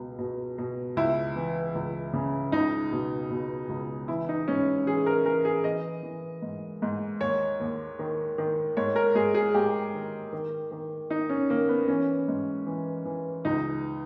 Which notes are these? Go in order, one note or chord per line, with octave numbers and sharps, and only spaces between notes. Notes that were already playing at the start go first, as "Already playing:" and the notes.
Already playing: C#2 B2
B2
B2
C#2 E4
E3
C#2
C#3
C#2 D#4
B2
B2
C#2
E3 E4
D#4
G#2 C#4
E3 G#4
A#4
E3 A#4
G#4
E3 D#5
E3
G#2
G#2
D#2 C#5
D#2
D#3
D#3
G#2 C#5
A#4
G#2 G#4
G#4
G#2 G4
D#3
D#3
D#3
D#3 D#4
C#4
D#3 A#3
B3
E3 C#4
G#2
E3
E3
C#2 D#4